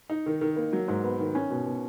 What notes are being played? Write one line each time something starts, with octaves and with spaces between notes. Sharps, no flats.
D#4
D#3
D#3
A#3
F#3
G#2
B3
D#3
C#4
B2
B2